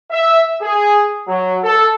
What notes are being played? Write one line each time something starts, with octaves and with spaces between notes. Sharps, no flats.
E5
G#4
F#3
A4